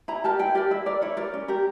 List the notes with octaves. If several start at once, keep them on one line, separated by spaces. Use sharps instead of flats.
E4 A#5
G4 A#4 A5
E4 G5
G4 A#4 D5
E4 E5
A#4 D5
E4 C#5
A#4 D5
C#4
G4 A#4